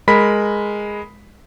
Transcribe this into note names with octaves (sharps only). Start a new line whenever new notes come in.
G#3 A#4 B5 B6